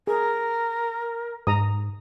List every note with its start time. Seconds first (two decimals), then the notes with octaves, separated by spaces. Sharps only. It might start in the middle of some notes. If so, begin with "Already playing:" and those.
0.07 G#4 A#4
1.47 G#2 A#5 D#6